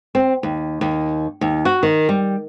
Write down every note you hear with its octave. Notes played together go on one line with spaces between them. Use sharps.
C4
D#2
D#2
D#2
F#4
D#3
G3